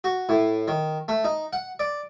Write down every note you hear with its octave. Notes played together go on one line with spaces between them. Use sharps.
F#4
A2
D#3
A3
D#4
F#5
D5